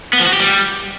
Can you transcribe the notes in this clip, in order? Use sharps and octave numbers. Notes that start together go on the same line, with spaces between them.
B3
F3
F#4
G4
G3